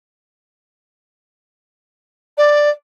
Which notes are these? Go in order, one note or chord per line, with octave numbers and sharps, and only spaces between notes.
D5